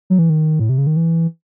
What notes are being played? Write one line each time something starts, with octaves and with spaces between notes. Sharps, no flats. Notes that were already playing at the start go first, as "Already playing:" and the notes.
F#3
E3
D#3
A2
C3
C#3
D#3
E3